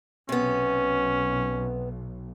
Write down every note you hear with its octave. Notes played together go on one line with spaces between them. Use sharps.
B1 C3 B3 C#4